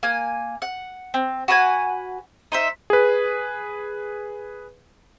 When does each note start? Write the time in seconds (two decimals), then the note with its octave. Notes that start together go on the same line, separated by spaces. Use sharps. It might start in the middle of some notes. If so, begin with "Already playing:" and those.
0.03 A#3 G#5
0.62 F#5
1.14 C4
1.48 F#4 B4 F#5 G#5
2.52 D#4 C5 E5
2.90 G#4 B4